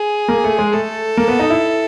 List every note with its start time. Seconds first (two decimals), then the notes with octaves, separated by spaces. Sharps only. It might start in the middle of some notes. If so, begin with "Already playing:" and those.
Already playing: G#4
0.28 A#3
0.44 A3
0.59 G#3
0.73 A3 A4
1.17 A#3
1.28 B3
1.39 D#4
1.50 E4